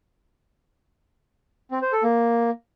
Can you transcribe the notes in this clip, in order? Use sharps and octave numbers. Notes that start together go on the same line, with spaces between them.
C4
C5
A4
A#3